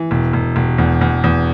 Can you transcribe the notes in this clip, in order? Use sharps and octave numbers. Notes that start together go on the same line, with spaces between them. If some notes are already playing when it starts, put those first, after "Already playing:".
Already playing: E3
E1
E1
E1
E2
E2
E2